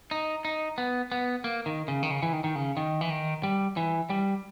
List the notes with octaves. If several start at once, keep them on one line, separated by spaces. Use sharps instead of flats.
D#4
D#4
B3
B3
A#3
D#3
C#3
D#3
C#3
E3
D#3
D#3
C#3
D#3
E3
D#3
G3
E3
G3